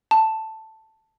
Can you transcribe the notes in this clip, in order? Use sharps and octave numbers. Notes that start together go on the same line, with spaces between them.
A5